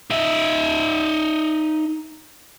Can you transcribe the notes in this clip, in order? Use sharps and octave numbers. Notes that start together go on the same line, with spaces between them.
D#4 E5